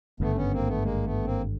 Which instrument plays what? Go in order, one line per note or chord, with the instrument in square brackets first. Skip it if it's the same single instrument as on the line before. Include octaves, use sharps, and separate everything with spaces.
[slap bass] G#1 G2 D3 [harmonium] A3 B3
[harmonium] B3 C#4
A#3 C4
A3 B3
G#3 A#3
A3 B3
A#3 C4